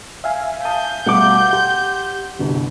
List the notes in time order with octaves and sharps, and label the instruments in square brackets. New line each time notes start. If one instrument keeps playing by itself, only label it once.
[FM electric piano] E5 F5 G#5
[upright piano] A5 D#6 D#7 [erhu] G6
[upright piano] B2 G3 A3 [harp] F#5 D6
[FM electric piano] G4 [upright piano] C6
[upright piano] G1 C2